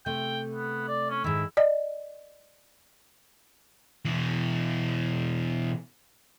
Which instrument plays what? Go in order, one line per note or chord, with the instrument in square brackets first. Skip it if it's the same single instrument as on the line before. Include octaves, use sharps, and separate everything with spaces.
[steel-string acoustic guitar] C3 A3 [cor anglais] G5
[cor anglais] B3
D5
C#4
[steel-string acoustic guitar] G#2 D#3 [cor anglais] E4
[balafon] D5 D#5
[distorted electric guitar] B2 E3